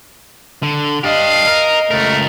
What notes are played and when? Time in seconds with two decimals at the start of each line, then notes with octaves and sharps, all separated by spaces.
0.63 D3
1.04 D4 G4 D#5 F5
1.47 A#4
1.91 C#2 A3 A#4